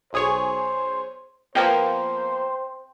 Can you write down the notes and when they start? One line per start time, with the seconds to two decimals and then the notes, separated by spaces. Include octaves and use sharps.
0.13 B1 G#4 C5 C#5
1.55 F3 A#3 B3 C5 G5